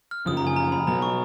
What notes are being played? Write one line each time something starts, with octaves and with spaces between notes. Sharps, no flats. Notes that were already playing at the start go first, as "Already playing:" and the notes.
F6
F#2 C#3 F3 D#6
A#5
G#5
A#5
B5
B2 F#3 B3 A#5
C#6